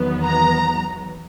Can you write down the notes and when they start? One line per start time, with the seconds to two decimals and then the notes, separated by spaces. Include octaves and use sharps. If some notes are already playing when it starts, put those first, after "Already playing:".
Already playing: E2 D#3 F#3 B3
0.24 A#5